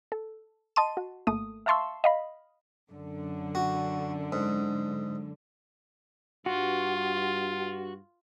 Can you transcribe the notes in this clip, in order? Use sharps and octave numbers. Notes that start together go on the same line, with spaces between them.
A4
D#5 A5 C6 D#7
F#4
G#1 A3 A#3 D#6
E5 F5 A5 C6 C#6 E6
D#5 F5 B5
F#2 D3
F#4
G#2
G2 F4 F#4